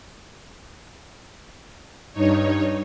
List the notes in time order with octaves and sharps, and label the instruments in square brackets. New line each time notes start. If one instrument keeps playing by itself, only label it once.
[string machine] G2 D#4 C#5